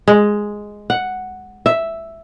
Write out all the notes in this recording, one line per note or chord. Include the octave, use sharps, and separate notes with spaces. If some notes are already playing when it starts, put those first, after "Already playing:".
G#3
F#5
E5